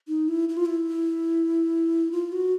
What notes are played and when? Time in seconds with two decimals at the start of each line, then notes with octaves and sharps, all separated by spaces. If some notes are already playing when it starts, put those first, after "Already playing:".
0.08 D#4
0.28 E4
0.49 E4
0.57 F4
0.66 E4
2.12 F4
2.32 F#4